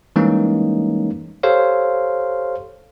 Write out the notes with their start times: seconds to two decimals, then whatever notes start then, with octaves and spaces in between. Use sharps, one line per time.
0.16 E3 G3 G#3 A#3 C#4 D#4
1.43 G4 A4 C5 C#5 F5